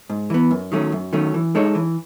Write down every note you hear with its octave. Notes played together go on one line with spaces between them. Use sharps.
G#2
E3 B3
F#2
D#3 F#3 A3 C#4
F#2
D#3 F#3 A3 C#4
E3
G#3 D#4 A4 C#5
E3